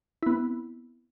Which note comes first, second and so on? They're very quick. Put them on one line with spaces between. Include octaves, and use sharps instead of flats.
E4 B3 C4